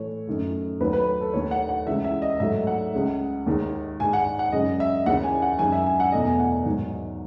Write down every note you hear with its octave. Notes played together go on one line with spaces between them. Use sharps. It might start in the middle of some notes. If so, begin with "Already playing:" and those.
Already playing: A2 E3 A3 C#5
F#2 D#3 A3
D#2 D#3 F#3 A3 B4
B4
A4
D#2 D#3 A3 C#5
F#5
F#5
C#2 C#3 E3 E5
E5
D#5
G#2 F#3 A3 E5
F#5
C#2 C#3 G#3
D#2 D#3 G#3
G#2 D#3 G#3 G#5
F#5
F#5
F#2 C#3 G#3 D#5
E5
D#2 C#3 E3 F#5
G#5
F#5
F#2 D#3 G#3 G#5
E5
G#5
F#5
E2 B2 A3 D#5
G#5
F#5
G#2 D#3 F#3